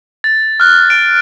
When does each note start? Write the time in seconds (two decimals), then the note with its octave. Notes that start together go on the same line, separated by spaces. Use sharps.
0.24 A6
0.60 F6 F#6
0.90 D7